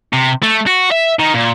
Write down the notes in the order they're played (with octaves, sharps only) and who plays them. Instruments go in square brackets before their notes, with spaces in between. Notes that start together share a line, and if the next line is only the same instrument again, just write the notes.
[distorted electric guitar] C3
A3
F#4
E5
D#3
A#2